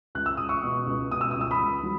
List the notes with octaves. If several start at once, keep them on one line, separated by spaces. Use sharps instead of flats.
C#2 F#6
E6
C#2 D#6
C#6 E6
B2
C#2
B2 D#6
E6
C#2 D#6
E6
B5 D#6
C#2
F#3